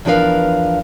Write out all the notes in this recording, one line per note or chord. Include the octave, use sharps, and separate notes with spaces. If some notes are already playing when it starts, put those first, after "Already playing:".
E2 F3 D4 A#4 B4 F5